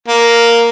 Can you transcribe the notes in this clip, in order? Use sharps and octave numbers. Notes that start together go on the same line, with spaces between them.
A#3